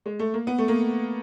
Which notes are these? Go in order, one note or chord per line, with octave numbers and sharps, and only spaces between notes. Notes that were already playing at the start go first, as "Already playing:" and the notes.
G#3
A3
A#3
B3
A3
A#3